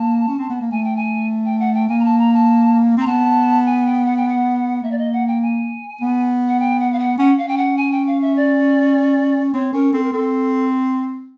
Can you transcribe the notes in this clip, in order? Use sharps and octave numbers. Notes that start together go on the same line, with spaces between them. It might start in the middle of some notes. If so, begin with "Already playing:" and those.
Already playing: A#3 A5
C#4
C4
B3
A#3
A3 G#5
G5
G#5
G5
F#5
G5
A#3 G#5
A#5
A5
A#5
A5
C4 A#5
B3 A5
G#5
G5
F#5
G5
F#5
A#3 E5
D5
D#5
F#5
G5
G#5
B3
F#5
G5
F#5
F5
F#5
C#4 F#5
F5
C#4 G5
F#5
G#5
G5
F5
E5
D5
C4 C#5
C#4 A#4
C4 A4
A#4
C4 A4